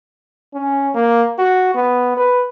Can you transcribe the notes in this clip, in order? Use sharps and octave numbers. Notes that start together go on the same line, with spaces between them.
C#4
A#3
F#4
B3
B4